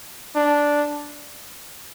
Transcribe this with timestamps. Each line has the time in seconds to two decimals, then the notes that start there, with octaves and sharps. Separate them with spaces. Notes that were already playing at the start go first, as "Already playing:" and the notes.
0.36 D4